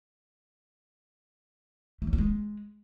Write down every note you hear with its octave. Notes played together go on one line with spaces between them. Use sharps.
A3
F#3
B3
G#3